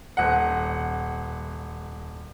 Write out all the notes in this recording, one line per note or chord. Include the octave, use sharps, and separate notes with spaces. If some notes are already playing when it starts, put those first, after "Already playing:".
D#1 F#5